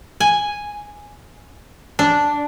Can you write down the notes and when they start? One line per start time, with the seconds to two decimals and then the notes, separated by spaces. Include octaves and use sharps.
0.20 G#5
1.99 D4